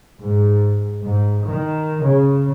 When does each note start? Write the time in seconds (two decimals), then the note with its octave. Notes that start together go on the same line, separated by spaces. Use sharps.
0.21 G#2
1.03 G#2
1.46 D#3
2.03 C#3